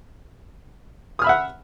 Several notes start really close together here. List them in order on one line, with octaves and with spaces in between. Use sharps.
D#6 F6 B5 E5 F#5